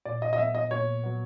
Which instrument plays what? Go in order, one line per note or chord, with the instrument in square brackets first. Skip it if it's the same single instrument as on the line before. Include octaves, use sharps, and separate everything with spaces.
[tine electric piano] A#2 [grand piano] D5
[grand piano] D#5
D#5
[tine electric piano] F#3 B3 [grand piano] E5
[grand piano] D#5
[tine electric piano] A#2 [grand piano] C#5
[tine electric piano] F#3 B3